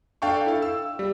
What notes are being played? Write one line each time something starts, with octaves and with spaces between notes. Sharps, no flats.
D4 A4 F5 G5 A5 C#6
E4 A4 F5
E6
G3